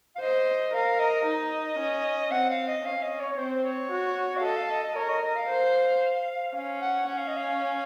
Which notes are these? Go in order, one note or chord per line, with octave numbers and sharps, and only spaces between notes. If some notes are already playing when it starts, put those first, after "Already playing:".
F5
C5 D#5
A#4 F5
D#5
D#4
C#4
C4 F#5
F5
D#5
C#4 F5
D#5
C#5
C#5
C4 C5
C#5
F#4
F5
A4 D#5
F5
D#5
D#5
A#4 C#5
D#5
D#5
F5
C5
C#4 F5
F#5
C#4 F#5
F5
D#5
F5